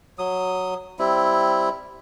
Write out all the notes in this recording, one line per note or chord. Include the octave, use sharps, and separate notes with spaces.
F#3 D#6
G3 C4 E4